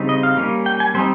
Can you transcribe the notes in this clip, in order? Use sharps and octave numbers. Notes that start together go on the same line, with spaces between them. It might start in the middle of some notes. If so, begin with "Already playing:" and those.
Already playing: C#3 G3 C4 D#4
D#5
F5
G3 A#3 C#4
G5
G#5
G3 C4 D#4 C5